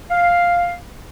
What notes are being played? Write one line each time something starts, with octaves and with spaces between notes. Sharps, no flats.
F5